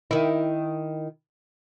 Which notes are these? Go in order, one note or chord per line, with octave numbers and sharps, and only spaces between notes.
D#3 E4